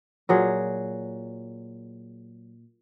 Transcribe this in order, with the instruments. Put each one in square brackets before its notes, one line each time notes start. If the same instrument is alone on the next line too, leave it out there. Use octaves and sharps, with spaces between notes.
[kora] A#2 F#3 G#4